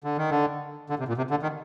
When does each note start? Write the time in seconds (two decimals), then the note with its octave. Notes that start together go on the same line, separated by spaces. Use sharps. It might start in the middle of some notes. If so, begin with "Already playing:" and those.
0.04 D3
0.17 D#3
0.31 D3
0.90 D3
0.99 C3
1.08 A#2
1.17 C3
1.31 D3
1.43 D#3